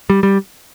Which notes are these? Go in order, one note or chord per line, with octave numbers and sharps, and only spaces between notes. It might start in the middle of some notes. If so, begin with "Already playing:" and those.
G3
G3